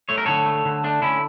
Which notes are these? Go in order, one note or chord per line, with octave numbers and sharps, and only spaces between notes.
A3 C#5
A#4
D3 A4 C#5
A3
D3
A3 D4
D3 C#4 E4